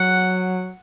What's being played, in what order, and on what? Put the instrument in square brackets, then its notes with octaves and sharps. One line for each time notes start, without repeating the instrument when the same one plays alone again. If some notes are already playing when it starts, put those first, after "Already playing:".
Already playing: [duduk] F#3 [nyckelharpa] F#5